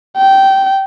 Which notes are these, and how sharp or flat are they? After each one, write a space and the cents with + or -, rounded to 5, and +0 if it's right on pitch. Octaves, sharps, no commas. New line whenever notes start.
G5 -15